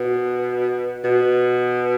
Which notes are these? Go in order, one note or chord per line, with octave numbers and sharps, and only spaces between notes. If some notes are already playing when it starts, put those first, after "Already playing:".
Already playing: B2
B2